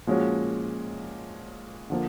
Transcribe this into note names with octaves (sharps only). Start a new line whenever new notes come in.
A#2 F3 G#3 C#4 F#4
D3 F3 A#3